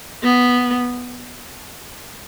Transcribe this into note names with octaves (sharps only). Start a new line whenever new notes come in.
B3